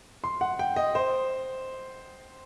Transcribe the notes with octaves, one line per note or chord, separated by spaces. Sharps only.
C6
F#5
G5
D#5
C5